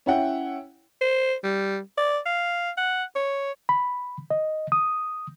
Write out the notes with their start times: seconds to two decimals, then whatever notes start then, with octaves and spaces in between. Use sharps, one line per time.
0.06 C#4 E4 F#5 G5
1.01 C5
1.44 G3
1.98 D5
2.26 F5
2.77 F#5
3.16 C#5
3.69 B5
4.30 D#5
4.72 D#6